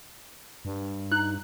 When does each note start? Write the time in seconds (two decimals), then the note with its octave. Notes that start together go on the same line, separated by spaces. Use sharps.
0.65 G2
1.12 D#4 F#6